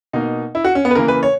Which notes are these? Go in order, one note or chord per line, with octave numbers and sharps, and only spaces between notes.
B2 A#3 D#4
E4
F#4
C#4
B3
B4
C#3 E3 A#3 A#4
B4
C#5